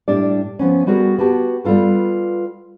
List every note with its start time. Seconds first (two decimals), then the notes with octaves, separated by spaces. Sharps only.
0.08 A2 G3 D4 D5
0.59 F3 B3 C#4
0.87 G3 B3 F#4 G#4 A#4
1.19 B3 F#4 G4 A5
1.64 G3 B3 F4 A4 B4